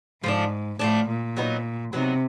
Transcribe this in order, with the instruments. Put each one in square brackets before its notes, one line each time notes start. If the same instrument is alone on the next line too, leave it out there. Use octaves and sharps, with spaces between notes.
[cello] G#2 [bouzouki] F3 A3 D4
[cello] A2 [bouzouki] F3 A3 D4
[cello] A#2
[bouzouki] F#3 B3 D#4
[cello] C3 [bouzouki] F#3 B3 D#4